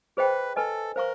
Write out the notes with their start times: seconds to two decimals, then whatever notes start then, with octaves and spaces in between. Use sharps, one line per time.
0.17 G#4 B4 C5 D#5 G5 B5
0.56 A4 B4 D#5 G#5 B5
0.96 A#4 C5 F5 A#5 C#6